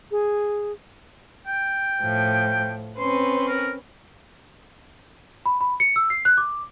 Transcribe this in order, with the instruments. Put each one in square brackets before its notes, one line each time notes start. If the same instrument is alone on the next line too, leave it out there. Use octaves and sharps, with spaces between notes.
[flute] G#4
[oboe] G5
[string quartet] A2 F3
[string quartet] C4 C#4 B4 [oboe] C6
[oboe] A#4
[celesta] B5
B5
C#7
E6
C7
F#6
D6